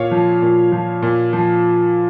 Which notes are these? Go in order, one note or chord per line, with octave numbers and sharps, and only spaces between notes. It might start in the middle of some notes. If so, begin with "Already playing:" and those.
Already playing: A#2 C#5 F5
F3
A#2
F3
A#2
F3